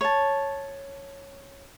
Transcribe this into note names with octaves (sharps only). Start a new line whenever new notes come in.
C#5 A5